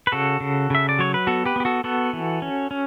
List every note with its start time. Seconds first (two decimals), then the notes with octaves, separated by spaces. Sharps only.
0.07 B4
0.12 C#3 F#4 A4
0.40 C#3
0.70 C#3 E5
0.89 D5
0.99 F#3 C#5
1.14 B4
1.27 B3 F#4 A4
1.45 G4 B4
1.56 B3 G4
1.65 F#4 A4
1.84 B3 F#4 A4
2.13 E3
2.42 C#4
2.71 C#4